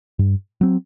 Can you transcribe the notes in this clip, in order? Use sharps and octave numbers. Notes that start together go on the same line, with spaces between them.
G2
F#3 C4